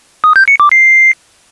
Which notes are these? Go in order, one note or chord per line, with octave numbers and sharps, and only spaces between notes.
D#6
G6
C#7
D6
C7